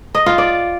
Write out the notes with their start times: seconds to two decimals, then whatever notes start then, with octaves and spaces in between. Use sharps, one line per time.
0.15 D#5
0.26 F4
0.38 D5